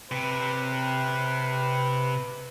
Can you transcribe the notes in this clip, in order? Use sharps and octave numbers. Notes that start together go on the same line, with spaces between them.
C3 B4